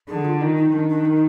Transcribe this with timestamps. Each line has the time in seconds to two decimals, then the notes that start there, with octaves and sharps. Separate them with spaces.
0.08 D3 G#4
0.25 F4
0.41 D#3 D#4
0.56 D#4
0.73 D#3 D4
0.89 D4
1.05 D#4